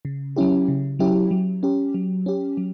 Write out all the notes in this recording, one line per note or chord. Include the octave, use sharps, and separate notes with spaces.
C#3
F#3 C#4 E4 G4
C#3
F#3 C#4 E4 G4
F#3
C#4 G4
F#3
C#4 G4
F#3